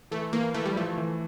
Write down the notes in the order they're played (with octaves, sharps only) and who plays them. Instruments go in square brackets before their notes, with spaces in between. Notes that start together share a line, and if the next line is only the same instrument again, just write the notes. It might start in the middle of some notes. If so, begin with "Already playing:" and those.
[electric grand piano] E3 [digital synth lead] A3
[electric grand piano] E3 [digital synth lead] A#3
[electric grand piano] E3 [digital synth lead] A3
[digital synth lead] G3
[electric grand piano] F3 [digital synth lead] A3
[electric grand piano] E3